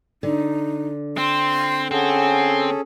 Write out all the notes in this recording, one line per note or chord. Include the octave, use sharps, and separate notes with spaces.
D3 D#4
C4 C6
C4 C#4 G#4 A4 F#5